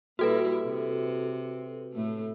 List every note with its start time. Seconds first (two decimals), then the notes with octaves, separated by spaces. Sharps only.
0.19 A#2 G3 E4 F#4 A4 B4
0.63 C3
1.93 A2 A3